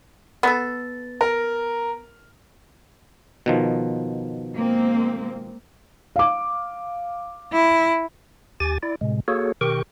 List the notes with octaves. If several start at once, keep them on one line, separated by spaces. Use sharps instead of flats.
B3 A4
A#4
B2 D#3 F3
G#3 A#3 C4
F5 D6
E4
D#2 G4 G#5 A6
E4 D5
A2 C3 G#3
A#3 F#4 G#4 A4 C#5
B2 D#3 G4 A#4 G5 C#6